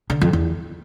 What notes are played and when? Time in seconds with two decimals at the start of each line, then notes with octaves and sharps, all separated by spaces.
0.10 D3
0.21 F2
0.33 E2